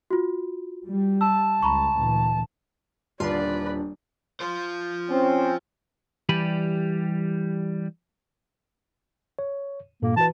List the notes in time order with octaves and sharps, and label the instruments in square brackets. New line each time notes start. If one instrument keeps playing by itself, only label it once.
[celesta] F4 F#4
[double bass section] G3
[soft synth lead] A5 [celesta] E6
[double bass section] C#2 [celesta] A#5 B5 C#6
[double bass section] D2 A#2 E3
[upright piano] D#1 [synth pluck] D3 F4 C6 [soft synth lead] D4 [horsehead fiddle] B4 D5
[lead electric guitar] F4 C5
[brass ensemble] C4 C#4
[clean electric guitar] E3 G3 G4 D5 G#5 B5
[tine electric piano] C#5
[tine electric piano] G2 A#2 A4 [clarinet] A#3
[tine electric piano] E3 F#4 B4 [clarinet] A5